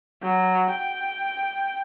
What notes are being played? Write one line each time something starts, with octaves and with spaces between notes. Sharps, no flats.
F#3
G5